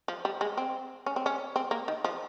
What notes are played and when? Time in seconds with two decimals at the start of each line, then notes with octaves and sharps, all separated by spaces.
0.08 F3
0.25 G3
0.41 G#3
0.57 C4
1.06 C#4
1.16 C4
1.26 C#4
1.56 C4
1.71 A#3
1.88 D#3
2.04 F3